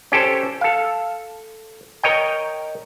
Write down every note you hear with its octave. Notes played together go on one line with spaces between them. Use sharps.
C#4 G4 A4 C5
A4 F5
A#4 C#5 D#5 G5